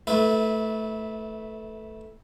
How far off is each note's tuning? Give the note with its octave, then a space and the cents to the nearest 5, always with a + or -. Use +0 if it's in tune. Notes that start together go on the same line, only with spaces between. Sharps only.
A3 +0 E4 -25 B4 +0